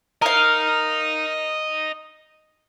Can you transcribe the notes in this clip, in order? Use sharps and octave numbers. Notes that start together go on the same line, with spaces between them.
A#4 D#5 F5 A#5